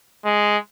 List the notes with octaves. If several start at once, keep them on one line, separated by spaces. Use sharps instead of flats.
G#3